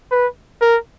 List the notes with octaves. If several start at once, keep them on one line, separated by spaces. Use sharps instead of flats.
B4
A#4